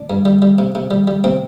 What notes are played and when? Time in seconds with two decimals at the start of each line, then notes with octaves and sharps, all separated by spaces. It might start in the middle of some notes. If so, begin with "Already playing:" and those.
Already playing: D4
0.10 G2
0.25 G3
0.42 G3
0.58 C3
0.75 C3
0.91 G3
1.07 G3
1.24 C3 C4